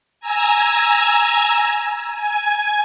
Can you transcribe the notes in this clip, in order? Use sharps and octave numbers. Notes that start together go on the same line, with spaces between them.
G#5 A#5 E6 G#6
G#5